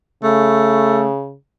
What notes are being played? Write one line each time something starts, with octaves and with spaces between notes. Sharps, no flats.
C#3 A3